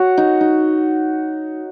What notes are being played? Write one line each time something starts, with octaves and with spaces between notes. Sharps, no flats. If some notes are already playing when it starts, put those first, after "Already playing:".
Already playing: F#4 C#5
D#4
D#4